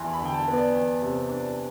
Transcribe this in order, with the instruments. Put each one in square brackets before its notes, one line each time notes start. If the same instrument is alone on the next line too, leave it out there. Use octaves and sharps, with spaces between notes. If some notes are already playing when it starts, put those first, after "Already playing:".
Already playing: [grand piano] E2 E4 [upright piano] A5 B5 C6
[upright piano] B5
[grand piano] D3
[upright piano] G5
A5
[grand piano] B3
[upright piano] D5
[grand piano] E2
C3
D4